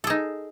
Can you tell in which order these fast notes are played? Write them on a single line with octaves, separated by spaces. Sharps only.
A4 G#4 D#4